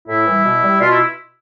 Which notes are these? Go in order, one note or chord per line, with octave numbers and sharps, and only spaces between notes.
A2 E4
E3 G3
B2
G3
B2 F4
E4